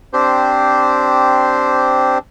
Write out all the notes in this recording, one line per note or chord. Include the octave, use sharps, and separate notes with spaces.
C4 D4 G4 C5